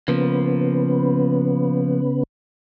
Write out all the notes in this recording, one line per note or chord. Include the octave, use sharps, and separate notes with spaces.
C#3 F3 A#3 B3